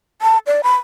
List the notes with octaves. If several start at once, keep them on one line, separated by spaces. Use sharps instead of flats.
A5
D5
B5